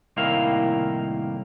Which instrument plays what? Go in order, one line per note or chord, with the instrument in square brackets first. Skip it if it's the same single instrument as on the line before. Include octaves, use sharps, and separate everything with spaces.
[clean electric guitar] C2 A2 D#3 A#3 E4 F5